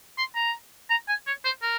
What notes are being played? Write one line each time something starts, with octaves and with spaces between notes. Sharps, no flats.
C6
A#5
A#5
G#5
C#5
C5
A#4